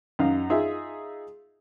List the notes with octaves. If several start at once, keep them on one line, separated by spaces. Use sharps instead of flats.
F#2 D#4 F5
D#4 F4 G#4 E5